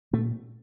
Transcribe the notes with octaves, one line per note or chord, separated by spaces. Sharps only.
A#2 A3